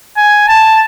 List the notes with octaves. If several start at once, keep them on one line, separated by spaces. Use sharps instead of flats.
G#5
A5